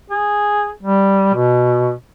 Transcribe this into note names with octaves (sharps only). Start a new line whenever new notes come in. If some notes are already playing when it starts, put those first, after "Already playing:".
G#4
G3
B2